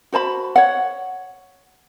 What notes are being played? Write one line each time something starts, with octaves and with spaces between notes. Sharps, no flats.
F#4 C5 A5 B5
C#5 F#5